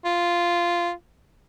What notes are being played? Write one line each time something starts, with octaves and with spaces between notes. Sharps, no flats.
F4